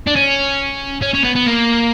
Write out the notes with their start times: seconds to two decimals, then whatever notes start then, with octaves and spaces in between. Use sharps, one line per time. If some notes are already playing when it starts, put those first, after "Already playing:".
0.07 D4
0.16 C#4
1.02 C#4
1.14 C#4
1.24 B3
1.36 B3
1.46 A#3